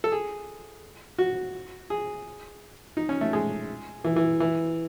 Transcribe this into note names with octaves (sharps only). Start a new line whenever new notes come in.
A4
G#4
F#4
G#4
D#4
C#4
A3
G#3
E3
E3
E3